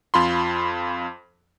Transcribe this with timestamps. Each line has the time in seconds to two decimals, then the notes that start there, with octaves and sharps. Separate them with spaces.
0.14 F2 F4 B5 C6